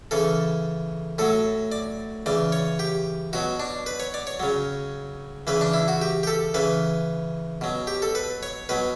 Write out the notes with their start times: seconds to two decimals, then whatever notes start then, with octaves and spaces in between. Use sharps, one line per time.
0.11 C#3 E3 A4
1.18 A2 F#3 A4
1.72 D5
2.26 C#3 E3 D5
2.52 C#5
2.79 G4
3.33 B2 F#3 F#4
3.60 D4
3.86 B4
4.00 C#5
4.14 D5
4.27 C#5
4.40 C#3 F#3
5.47 C#3 E3 B4
5.61 D4
5.74 E4
5.88 F#4
6.02 G4
6.23 G4
6.27 A4
6.54 C#3 E3 B4
7.61 B2 F#3
7.87 G4
8.02 A4
8.15 B4
8.43 C#5
8.69 B2 F#3 B4